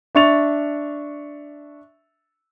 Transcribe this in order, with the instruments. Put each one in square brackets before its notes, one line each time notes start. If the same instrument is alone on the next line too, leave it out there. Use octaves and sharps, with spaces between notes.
[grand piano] D4 E5 C#6 A6 F7